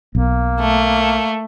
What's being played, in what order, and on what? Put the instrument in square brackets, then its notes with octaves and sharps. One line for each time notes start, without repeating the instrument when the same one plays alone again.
[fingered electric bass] B1 [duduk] A#3
[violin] A3